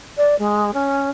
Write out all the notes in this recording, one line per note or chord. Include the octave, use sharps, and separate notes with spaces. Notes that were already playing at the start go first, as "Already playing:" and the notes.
D5
G#3
C#4